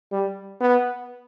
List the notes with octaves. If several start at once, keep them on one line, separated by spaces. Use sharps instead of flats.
G3
B3